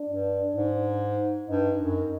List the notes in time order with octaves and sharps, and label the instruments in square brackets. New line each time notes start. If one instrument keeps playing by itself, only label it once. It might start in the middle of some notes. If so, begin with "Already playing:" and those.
Already playing: [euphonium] D4
[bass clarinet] G2
G#2
[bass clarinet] G2 [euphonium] D#4
[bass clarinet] F#2